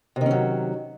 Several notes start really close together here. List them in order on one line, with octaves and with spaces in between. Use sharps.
C3 D#3 C#4 F#3